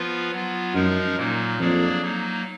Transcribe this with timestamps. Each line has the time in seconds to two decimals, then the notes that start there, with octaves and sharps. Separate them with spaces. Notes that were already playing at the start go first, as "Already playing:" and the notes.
Already playing: F3 B3 F4 B4
0.31 F#3 B3 F4
0.74 F#2 F3 G#3 D#4 A#4
1.16 A#2 F#3 A#3 D#4
1.59 F2 F#3 A#3 D4 G#4 D5
2.02 F#3 A#3 D#4